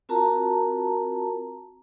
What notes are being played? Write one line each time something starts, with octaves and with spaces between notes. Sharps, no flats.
C4 F4 F#4 A#4 A5 A#5